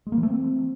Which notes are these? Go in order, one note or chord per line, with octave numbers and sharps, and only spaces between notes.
G#3
A#3
E3
A3
C4